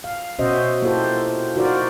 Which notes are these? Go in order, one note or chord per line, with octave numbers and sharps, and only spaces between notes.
F5
B2 C#4 F#4 C5 D#5 E5
A#3 E4 F4 G4 A4 C5
D#4 F4 F#4 A#4 C5 D5